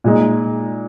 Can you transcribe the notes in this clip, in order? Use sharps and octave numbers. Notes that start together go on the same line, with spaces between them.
A#2 G#3 D#4